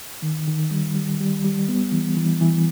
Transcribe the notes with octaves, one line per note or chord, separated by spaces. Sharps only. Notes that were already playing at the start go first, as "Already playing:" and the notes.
D#3
D#3
G3
G3
G3
G3
B3
E3
E3
E3